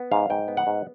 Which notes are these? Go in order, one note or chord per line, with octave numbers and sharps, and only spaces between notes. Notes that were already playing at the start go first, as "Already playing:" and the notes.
Already playing: B3
G#2 F5
G#2 G5
B3
F#5
G#2